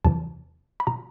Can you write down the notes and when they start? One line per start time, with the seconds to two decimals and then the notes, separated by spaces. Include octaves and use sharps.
0.04 E2 C3 E3 A5
0.80 B5
0.87 B2 A#5